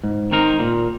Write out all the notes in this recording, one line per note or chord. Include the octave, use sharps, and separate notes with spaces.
G#2
D#3 C4 D#4 A#4
A#2